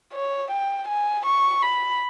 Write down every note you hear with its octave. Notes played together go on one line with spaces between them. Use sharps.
C#5
G5
G#5
C#6
B5